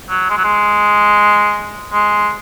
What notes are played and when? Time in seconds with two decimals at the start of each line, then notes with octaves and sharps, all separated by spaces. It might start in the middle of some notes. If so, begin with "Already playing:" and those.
0.09 F#3
0.30 G#3
0.37 F#3
0.44 G#3
1.93 G#3